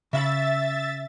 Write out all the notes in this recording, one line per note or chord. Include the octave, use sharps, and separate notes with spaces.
C#3 E5 F5 B5 A6